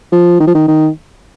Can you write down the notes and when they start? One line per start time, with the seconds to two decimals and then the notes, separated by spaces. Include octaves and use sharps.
0.12 F3
0.40 D#3
0.47 F3
0.55 D#3
0.67 D#3